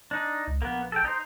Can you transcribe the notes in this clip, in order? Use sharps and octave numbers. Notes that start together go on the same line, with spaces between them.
D4 D#4
C#2
A#1 A#3 B3
A4 G5
D#4 C5